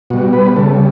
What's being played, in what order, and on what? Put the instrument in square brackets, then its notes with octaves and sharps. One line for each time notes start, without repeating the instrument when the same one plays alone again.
[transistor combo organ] B2 G3 F#4
B4
C#3 G3 A4